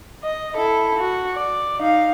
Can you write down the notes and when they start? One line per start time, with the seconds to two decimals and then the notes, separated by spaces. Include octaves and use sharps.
0.24 D#5
0.55 E4 A4
0.99 F#4
1.35 D5
1.79 D#4 F5